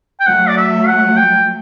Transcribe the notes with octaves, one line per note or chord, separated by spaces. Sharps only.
G5
F#3 A3 F#5
D5
E5
F#5
G5